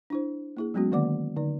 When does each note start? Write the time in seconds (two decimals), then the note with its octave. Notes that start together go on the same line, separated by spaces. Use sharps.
0.10 D4 E4 C5
0.57 A#3 E4 G#4
0.74 F#3 G#3 B3 C#4 F#4
0.92 D3 D#3 A#3 D5 F#5 D6
1.36 D3 D#4 D5